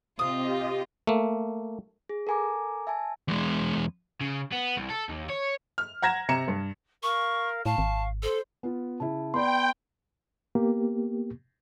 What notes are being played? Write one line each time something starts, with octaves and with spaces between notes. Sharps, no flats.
C3 C4 F4 G4 D#5 F5 D#6
A3 A#3
G#4
A4 A#4 G#5 A#5 D6
E5 G#5 A5
E2 G#3
C#3
B3
C2
A4
D#2
C#5
F6
F#5 A#5 G#6 A#6 E7
C3 A#5 C#7 E7
G2
A#4 F5 C#6
A2 F5 A5 C#6
G#1
A4 C5 C6
B3 F4
C#3 E4 A5
B3 D5 G5 B5 C6
A#3 B3 G4